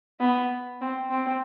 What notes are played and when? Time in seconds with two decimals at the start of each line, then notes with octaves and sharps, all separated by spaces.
0.20 B3
0.81 C4
1.10 C4